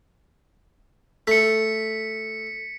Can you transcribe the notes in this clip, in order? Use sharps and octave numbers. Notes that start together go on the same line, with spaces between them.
A3 B6 C#7